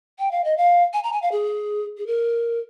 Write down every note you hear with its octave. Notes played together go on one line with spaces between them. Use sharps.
G5
F5
D#5
F5
G#5
A#5
G#5
F5
G#4
G#4
A#4